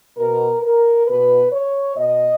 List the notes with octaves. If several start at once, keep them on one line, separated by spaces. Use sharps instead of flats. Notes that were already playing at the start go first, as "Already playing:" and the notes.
B2 A#4
A#4
B2 B4
C#5
B2 D#5